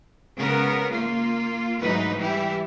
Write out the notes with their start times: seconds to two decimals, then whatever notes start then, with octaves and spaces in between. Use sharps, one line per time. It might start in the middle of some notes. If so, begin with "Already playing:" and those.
0.36 C#3 G#3 B3 A#4
0.92 A#3 F4
1.81 D2 G#2 E3 F#3 D#4 B4
2.19 E3 G3 E4 G4